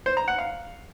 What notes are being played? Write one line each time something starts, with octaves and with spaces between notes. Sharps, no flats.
C5
A#5
F#5
F5